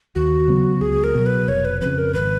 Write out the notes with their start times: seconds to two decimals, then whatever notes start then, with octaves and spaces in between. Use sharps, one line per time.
0.15 D#2 F#4
0.48 C#3 F#3 B3
0.81 C#2 G#4
1.04 A#4
1.14 B2 F#3
1.26 B4
1.48 F1 C#5
1.65 B4
1.81 F2 C#3 B4
1.98 A#4
2.14 G#1 B4